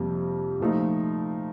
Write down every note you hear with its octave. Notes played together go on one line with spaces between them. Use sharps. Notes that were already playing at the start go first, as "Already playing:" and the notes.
Already playing: F2 C3 G3 A#3
A#2 F3 A3 D#4